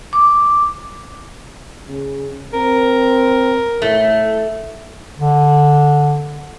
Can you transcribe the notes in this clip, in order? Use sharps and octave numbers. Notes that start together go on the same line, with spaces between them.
D6
C#3
C4 A#4
A2 A3
D3